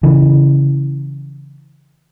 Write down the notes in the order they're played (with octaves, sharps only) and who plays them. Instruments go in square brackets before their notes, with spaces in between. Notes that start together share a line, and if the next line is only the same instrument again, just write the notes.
[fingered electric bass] C#3 E3